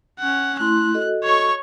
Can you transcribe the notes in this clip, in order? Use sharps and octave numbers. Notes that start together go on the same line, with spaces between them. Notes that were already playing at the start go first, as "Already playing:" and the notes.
C#4 F#5
A3 E4 C6 F#6
F#4 A4 D#5
C#5 C#6